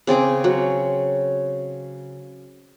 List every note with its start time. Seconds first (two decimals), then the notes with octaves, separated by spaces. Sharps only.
0.07 C#3 C4 G#4 D6
0.44 F#3